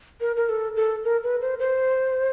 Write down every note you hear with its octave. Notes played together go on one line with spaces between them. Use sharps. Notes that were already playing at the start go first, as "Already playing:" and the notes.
A#4
A#4
A4
A4
A#4
B4
C5
C5